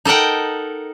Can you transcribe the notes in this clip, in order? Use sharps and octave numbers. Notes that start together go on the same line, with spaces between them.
D#4 A4 A#4 F#5 G5